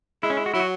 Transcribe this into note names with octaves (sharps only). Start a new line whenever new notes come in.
G#3 E4
C#4
E4
F#4
F#3 E4
F#4